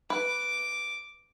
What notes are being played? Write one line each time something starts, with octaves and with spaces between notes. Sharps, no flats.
B4 D6